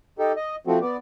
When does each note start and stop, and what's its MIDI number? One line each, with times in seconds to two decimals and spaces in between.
0.19 0.32 63
0.19 0.32 67
0.19 0.32 69
0.36 0.56 75
0.67 0.79 53
0.67 0.79 57
0.67 0.79 60
0.67 0.79 66
0.81 0.97 59
0.81 0.97 74